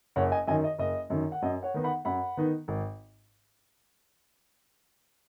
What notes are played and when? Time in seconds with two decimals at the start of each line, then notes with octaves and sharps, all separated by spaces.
0.16 F#1 C#5 F#5
0.32 D#5 G#5
0.47 F#2 D#3 D#5 G#5
0.64 D#5
0.79 F#1 D#5
1.10 F#2 D#3
1.32 F#5
1.42 F#2 D#5
1.63 C#5 F#5
1.74 D#3 B3 D#4
1.84 F#5 B5
2.05 F#2 F#5 B5
2.37 D#3 B3 D#4
2.68 G#1